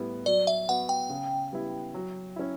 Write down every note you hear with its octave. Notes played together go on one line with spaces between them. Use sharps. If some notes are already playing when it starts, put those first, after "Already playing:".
Already playing: A2 G3 B3 E4
F#3 D5
E5
B3 F#4 F#5
G5
C#3
G3 B3 E4
F#3
C#4 E4